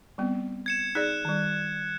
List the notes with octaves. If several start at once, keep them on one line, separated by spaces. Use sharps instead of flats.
G3 B3 C4
G#6 C#7 E7
D#4 G#4 D5 F#6
D#3 G3